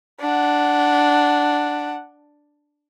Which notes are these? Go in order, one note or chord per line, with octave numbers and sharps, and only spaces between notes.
D4 F#5